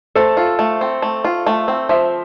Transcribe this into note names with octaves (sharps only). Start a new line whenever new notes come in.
A3 A4 C5
F4
A3
C4
A3
F4
A3
C4
F3 C5 E5